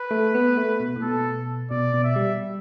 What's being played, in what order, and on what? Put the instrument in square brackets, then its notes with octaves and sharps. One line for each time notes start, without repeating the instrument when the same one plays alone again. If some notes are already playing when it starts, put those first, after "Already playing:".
Already playing: [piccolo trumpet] B4
[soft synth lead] A3
B3
A3
B2
A2
[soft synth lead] B2 [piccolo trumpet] A4
[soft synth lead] B2 [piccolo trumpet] D5
[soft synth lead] B2
[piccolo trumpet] E5
[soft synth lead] G3